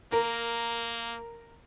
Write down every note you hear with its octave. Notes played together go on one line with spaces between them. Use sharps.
A#3 A#4